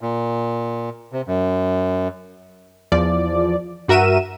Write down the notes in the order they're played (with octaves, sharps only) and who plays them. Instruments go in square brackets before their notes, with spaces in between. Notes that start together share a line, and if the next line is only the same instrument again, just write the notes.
[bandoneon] A#2
C3
F#2
[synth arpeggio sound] E2 F3 D5
G2 F#4 A#4 E5 D#7 E7